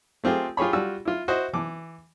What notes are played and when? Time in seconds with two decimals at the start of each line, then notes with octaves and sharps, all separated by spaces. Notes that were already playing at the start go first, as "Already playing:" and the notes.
0.24 A3 C4 F4 G4 G#4
0.57 F4 G4 G#4 C#5 B5
0.73 G3 F4 F#4 E6
1.05 E4 F4
1.28 E4 F#4 C5 D#5
1.53 E3 D6